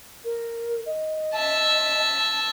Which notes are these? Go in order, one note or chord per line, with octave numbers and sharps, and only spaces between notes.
A#4
D#5
E5 A5